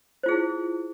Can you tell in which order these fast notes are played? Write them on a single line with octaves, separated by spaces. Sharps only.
C5 F4 G#4 E4